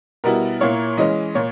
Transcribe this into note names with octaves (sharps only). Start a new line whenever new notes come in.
B2 G3 B3 E4 A#4
A#2 A#3 E4 C#5
E3 G#3 C#4 D#5
A#2 C#5